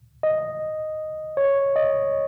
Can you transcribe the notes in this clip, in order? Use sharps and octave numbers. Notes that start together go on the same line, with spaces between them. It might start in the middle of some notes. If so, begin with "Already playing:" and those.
D#5
C#5
D#5